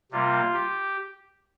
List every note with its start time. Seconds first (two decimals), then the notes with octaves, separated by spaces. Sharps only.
0.12 C3 G3 A#3 F4
0.54 G4